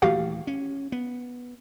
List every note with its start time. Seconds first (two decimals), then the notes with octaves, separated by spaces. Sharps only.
0.02 D#1 E3 A3 F#4 G4 F5
0.47 C#4
0.92 B3